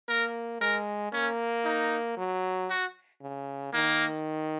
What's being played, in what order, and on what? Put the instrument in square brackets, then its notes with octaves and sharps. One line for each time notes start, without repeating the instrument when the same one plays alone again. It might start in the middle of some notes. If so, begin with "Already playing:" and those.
[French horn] A#3 [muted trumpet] A#4
[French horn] G#3 [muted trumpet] A#4
[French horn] A#3 [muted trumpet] C#4
[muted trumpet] D#4
[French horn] F#3
[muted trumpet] F#4
[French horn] C#3
[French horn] D#3 [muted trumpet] A#3